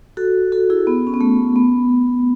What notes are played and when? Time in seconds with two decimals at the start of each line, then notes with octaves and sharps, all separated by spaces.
0.17 F#4 A4
0.52 F#4 A4
0.70 E4 G#4
0.87 B3
1.07 C#4
1.14 B3
1.21 A3
1.56 B3